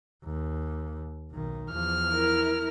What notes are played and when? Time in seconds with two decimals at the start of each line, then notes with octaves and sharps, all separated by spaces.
0.24 D#2
1.31 B1 D#3
1.72 E2 F3 F6
2.12 E4 A#4